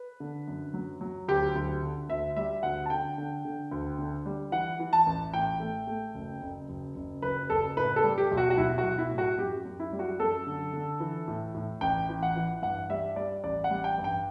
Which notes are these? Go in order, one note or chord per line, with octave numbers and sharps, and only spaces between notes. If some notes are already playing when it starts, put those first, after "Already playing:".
Already playing: B4
D3
F#2
F#3
F#3
D2 G4
D2
D3
D2 E5
G3 E5
D2 F#5
A5
D3 G5
D3
D3
D2
D3
G3
E3 F#5
E3
A5
A1
A2 G5
A3
A3
F#1
F#1
F#1
F#1
F#1 B4
F#1 A4
A2 B4
A4
G3
G4
B1
F#4
F#4
B1 E4
F#4
B1
E4
A2
F#4
F#2 G4
F#2
E4
G3
F#4
F#2 A4
D3
D3
E3
A2
A2
A1 G5
E3
F#5
E3
G2 F#5
G3 E5
G3 D5
A1 D5
F#5
G3
G5
G2
G5